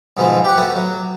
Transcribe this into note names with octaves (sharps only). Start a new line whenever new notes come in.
G#2 B2 E3 F3
G4 F#5
A3 B3 F#4
F#3